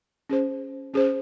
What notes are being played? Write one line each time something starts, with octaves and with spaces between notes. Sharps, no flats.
C#4 G#4 C5
C#4 G#4 C5